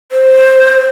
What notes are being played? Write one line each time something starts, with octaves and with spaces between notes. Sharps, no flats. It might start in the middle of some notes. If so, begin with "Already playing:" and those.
C5